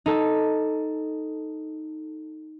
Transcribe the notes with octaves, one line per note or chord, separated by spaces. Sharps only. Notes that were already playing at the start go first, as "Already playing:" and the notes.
D#4 A4